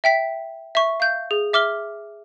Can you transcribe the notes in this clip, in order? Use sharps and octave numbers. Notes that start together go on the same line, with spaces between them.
E5 G5 B6
E5 C#6
F5 G6
G#4
E5 D6 F6 G7